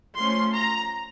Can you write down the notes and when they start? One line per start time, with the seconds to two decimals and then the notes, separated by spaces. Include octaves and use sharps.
0.17 F3 A3 C#4 C6
0.53 A#5